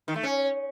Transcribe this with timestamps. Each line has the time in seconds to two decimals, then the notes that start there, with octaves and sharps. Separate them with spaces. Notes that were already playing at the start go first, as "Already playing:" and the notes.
0.08 D#3
0.16 A3
0.23 C#4